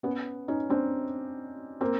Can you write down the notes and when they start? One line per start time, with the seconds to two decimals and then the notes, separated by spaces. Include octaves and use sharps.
0.03 B3 C#4
0.48 C#4 D#4
0.70 C4 D4
1.81 A#3 C4